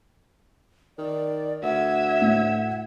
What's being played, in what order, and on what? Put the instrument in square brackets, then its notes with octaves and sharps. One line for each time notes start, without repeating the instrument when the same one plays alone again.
[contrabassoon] D#3 [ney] D5
[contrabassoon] D2 [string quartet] E5 G#6 [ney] F#5
[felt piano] A2